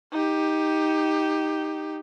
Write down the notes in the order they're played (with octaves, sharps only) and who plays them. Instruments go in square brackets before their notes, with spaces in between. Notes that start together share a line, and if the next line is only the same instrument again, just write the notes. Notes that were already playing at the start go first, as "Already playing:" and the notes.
[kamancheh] D#4 G4